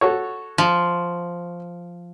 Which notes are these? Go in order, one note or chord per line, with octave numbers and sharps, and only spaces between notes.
F#4 A4 C#5
F3